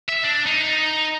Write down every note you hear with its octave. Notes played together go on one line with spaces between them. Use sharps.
E5
D4
D#4